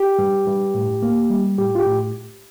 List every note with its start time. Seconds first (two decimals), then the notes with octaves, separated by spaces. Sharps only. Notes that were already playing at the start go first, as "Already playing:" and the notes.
Already playing: G4
0.19 G2
0.47 G2
0.74 A2
1.02 A#3
1.30 G3
1.58 A2 G4
1.75 F4
1.79 G4
1.86 A2